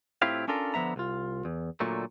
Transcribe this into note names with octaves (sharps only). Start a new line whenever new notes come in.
A2 C4 E4 F4 G4 F5
C#4 D4 F4 A4 A#4
D3 F3 B3 E5 A#5
C2 F4
E2
A#2 D3 F#3 A3